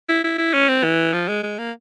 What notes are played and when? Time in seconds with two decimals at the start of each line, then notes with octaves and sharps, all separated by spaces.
0.09 E4
0.24 E4
0.38 E4
0.54 C#4
0.68 C4
0.83 E3
1.13 F3
1.28 G#3
1.43 G#3
1.58 A#3